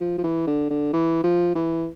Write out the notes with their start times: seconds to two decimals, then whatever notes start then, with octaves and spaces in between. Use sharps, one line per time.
0.01 F3
0.18 F3
0.24 E3
0.47 D3
0.70 D3
0.93 E3
1.24 F3
1.55 E3